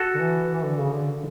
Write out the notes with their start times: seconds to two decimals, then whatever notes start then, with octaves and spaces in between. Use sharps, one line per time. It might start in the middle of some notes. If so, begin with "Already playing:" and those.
Already playing: F#4 A4
0.14 D3
0.20 E3
0.53 E3
0.65 D3
0.79 C#3
0.92 D3